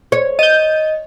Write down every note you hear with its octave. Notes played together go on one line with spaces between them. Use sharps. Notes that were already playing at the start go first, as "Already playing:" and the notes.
C#5
D#5 G6 D#7